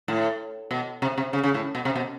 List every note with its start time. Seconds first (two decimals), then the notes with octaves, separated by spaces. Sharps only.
0.08 A2
0.71 B2
1.02 C3
1.18 C3
1.33 C#3
1.44 C#3
1.54 A2
1.75 B2
1.85 C3
1.96 B2